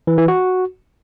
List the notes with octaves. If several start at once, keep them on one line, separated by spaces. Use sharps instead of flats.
E3
E3
F#4